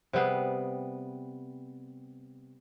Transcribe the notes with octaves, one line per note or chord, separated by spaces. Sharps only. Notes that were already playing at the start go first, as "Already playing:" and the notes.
C3 G3 B3 G#4